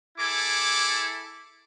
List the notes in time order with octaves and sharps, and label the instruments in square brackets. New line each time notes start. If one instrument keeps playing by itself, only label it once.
[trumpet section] E4 G#4 A4 D6